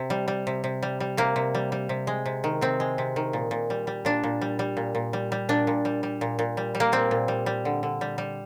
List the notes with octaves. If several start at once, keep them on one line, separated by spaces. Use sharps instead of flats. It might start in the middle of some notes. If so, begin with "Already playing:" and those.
Already playing: C3
G3
G3
C3
C3
G3
G3
C3 A#3
C3
G3
G3
C3
G#3
C3
D#3
C3 C4
G#3
C3
D#3
A#2
A#2
G3
G3
A#2 D4
A#2
G3
G3
A#2
A#2
G3
G3
A#2 D4
A#2
G3
G3
A#2
A#2
G3
G3
A#3
A#2 C4
A#2
G3
G3
D3
D3
G3
G3